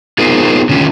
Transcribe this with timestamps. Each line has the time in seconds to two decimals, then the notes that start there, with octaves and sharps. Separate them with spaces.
0.18 B3 D#4 F4 G#4 A#4 C5
0.69 D3 D#3 C#4 F4